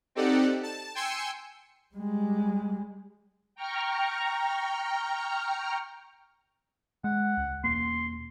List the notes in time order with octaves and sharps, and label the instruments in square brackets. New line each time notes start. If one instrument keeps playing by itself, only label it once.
[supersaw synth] C4 D#4 G4 A4 D5 F#5
A5
G5 G#5 C6 E6 C#7
[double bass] G3 G#3
[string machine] G5 A#5 C#6 F6
[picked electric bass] G#3 [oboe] F#5
[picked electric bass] C#2
[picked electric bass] E1 A#3 [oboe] C6